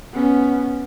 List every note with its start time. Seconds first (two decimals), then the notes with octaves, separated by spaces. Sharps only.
0.13 B3 C#4